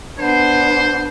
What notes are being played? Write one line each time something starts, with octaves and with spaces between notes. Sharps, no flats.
B3 D4 C5